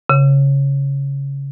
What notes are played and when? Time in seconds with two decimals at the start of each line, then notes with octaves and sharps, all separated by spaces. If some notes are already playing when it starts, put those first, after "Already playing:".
0.10 C#3